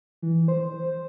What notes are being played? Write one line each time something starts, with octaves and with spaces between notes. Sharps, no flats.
E3
C5